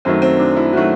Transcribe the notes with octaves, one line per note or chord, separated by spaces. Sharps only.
F#2 D#3 F#3 A3 C4
C4
D4
E4
D#3 F#3 A3 F#4